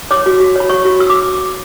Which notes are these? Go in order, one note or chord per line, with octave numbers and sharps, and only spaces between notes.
C#5 D6
F#4
F#4
C#5 B5
C#5 C#6
F#4
F#4 E6
D6